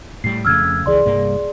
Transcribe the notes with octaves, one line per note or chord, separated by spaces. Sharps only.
A2 G3 C7
F2 C#3 A3 E6 F6 G#6
C#2 E3 G#4 D5 C6
C2 G2 A#3